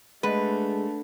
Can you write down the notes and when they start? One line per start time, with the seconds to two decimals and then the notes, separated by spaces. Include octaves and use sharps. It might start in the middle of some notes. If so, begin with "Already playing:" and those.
0.23 D3 G#3 A3 B4